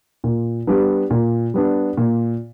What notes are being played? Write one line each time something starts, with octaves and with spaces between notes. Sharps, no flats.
A#2
G3 B3 D4
A#2
G3 B3 D4
A#2